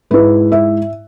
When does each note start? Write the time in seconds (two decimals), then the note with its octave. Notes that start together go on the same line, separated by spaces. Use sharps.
0.10 G#2 G#3 E4 B4
0.52 E5